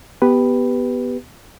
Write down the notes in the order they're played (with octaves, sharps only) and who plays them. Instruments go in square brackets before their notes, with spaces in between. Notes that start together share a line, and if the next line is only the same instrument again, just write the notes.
[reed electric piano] B3 G4 B4